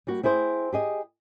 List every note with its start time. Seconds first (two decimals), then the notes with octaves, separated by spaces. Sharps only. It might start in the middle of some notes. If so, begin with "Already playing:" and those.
0.07 G3 A#3 F#4
0.23 C4 E4 G#4 C5
0.72 G4 G#4 D#5